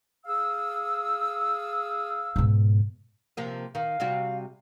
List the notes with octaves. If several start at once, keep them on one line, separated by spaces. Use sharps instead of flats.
G#4 F5 E6
G#2 B2
C3 F3 A#3
D#3 F5
C3 G3 F#4